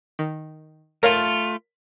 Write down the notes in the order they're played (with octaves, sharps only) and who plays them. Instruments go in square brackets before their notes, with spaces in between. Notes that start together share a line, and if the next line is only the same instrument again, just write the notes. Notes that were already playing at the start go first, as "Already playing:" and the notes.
[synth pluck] D#3
[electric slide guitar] A3 F4 [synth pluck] A#4 C#5 F5